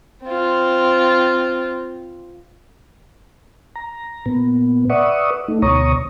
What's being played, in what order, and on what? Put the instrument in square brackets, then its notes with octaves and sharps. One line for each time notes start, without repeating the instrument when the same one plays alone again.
[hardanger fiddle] C4 F4
[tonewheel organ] A#5
A#2 B3
B4 D5 E5 F#5 C#6 D#6
A3 D#4
D2 B2 C#5 A#5 C#6 D#6